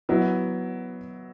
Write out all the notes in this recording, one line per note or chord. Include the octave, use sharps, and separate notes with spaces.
F#3 B3 E4